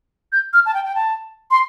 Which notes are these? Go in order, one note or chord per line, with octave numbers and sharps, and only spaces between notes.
G6
F6
A5
G5
G5
A5
C6